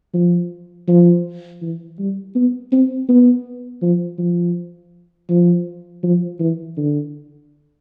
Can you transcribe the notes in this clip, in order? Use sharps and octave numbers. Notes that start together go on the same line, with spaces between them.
F3
F3
E3
G3
B3
C4
B3
F3
F3
F3
F3
E3
D3